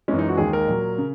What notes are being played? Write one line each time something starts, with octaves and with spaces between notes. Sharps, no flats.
F#2 E3 G#3 C#4
D#4
F#4
D#2 D#3 G#3 G#4
A#4
A#2 F#3
C#3